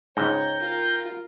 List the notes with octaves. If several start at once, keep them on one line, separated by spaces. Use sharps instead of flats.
C#2 G#2 C#5 G5 A#5 G6
F4 A#4